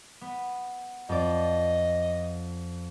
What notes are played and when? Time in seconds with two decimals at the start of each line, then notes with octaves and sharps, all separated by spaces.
0.21 B3
1.09 F2 D5 D#5